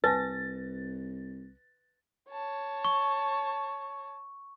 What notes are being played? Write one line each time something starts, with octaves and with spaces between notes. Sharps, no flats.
C2 B4 G#5 A5 A6 A#6
C#5 A5
C#6